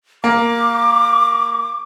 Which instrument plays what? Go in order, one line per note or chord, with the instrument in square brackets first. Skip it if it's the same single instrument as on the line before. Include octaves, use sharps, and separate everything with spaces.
[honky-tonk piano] A#3 [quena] D6